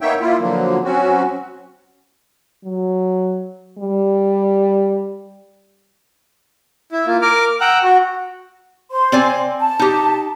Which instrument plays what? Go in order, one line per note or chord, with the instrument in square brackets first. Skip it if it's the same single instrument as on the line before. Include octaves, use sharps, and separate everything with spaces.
[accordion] A#3 B3 D#4 C#5 E5 G5
A#3 E4 F4
D3 F3 F#3 A#3
F#3 C4 C#4 F#4
[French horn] F#3
G3
[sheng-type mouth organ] E4
A#3 F4
A#4 D6 F6
F#5 G5 A#5 E6 F#6
F#4
[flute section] C5 C6
[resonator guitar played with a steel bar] C4 D5 G#5
[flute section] A5
[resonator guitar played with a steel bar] D#4 G4